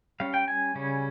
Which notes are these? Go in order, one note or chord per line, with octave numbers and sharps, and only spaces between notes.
G3 C#4 F5
G5
G#5
C#3 G3 C#4